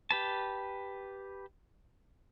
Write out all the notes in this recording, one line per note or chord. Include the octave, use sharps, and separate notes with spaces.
G4 B4 A5